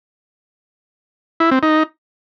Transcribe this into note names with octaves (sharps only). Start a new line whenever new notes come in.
E4
C4
D#4